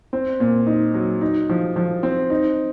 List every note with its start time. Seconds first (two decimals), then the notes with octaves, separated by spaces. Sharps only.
0.13 C4
0.40 A#2
0.67 D#4
0.94 F#3
1.21 D#4
1.49 F3
1.76 F3
2.03 C4
2.30 D#4